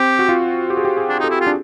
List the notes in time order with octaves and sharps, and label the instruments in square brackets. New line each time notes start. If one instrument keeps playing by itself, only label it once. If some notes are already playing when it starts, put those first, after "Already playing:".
Already playing: [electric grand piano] C4 [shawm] G4
[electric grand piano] F#4
F4
G4
G#4
G4
G#4
[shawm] D4
[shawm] D#4 [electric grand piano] A4
[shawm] E4
F4
[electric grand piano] D4